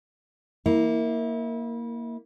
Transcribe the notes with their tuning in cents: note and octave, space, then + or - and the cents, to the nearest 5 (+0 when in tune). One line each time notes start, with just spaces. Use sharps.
A#3 +0 E4 -30